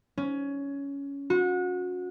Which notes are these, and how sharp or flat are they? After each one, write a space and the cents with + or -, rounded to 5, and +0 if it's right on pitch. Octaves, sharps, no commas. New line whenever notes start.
C#4 +15
F#4 -30